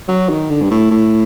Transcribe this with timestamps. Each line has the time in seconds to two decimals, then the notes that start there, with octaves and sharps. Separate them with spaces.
0.08 F#3
0.30 D#3
0.50 D3
0.62 G2
0.71 A2
0.91 A2